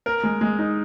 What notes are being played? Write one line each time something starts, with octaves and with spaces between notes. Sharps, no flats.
A#4
G#3
G#3
D#4